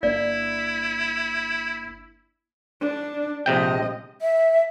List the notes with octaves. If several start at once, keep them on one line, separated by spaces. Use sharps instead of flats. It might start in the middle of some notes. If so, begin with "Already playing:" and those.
G1 A#3 D4 E4 D5
D4
A#1 C3 G#3 D#5 G5
E5